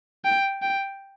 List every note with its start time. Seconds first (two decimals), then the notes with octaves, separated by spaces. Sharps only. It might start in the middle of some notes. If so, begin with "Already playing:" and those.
0.25 G5
0.62 G5